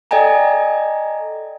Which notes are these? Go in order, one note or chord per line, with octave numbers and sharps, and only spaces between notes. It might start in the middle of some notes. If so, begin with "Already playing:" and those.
A4 D5 D#5 G5 G#5 A#5